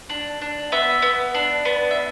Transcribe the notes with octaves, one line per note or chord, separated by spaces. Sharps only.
D4
D4
B3 E5
B3
D4
B3
E5